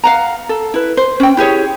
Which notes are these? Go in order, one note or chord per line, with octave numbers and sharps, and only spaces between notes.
F5 F#5 A#5
A4
E4 B4
C5
C#4 G5
E4 G4 G#4 C#5